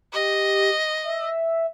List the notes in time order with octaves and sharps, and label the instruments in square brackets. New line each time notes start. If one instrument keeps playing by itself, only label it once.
[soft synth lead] G4 [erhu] D#5
[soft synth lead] E5